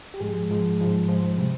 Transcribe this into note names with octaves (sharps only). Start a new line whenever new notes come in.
G4
G#2 F3 G#3 G#4
G#2 F3 G#3
G#2 F3 G#3
G#2 F3 G#3 C5
C5
C3 G3